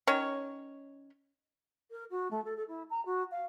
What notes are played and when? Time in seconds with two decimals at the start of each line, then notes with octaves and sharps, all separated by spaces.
0.07 D#3 C#4 C#5
1.91 A#4
2.10 F#4
2.31 A3
2.45 A4
2.57 A4
2.68 E4
2.90 A#5
3.05 F#4
3.31 F5